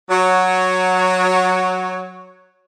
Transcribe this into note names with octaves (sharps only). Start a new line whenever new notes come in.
F#3 F#4 C#5